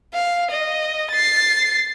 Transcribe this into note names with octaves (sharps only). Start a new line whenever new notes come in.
F5
D#5
A6 C7